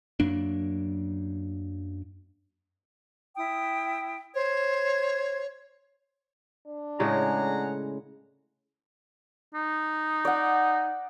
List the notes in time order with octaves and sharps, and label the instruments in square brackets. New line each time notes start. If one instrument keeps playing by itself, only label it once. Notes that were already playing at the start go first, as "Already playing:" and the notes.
[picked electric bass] F#2 F#3 A#3 D4
[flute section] E4 G5 D#6
[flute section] C5 G#6 [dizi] C#5
[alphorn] D4
[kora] A2 C#3 G#3 [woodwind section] G#4 F#5 A#5
[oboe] D#4
[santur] D5 F#5